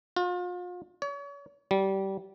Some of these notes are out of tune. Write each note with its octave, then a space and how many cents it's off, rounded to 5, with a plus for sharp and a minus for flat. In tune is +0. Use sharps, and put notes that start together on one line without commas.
F4 +40
C#5 +35
G3 -20